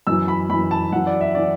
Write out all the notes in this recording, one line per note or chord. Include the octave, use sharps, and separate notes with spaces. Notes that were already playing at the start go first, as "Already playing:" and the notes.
F#2 E3 E6
B5
F#2 E3 B5
A5
F#2 E3 F#5
D5
E5
E3 D5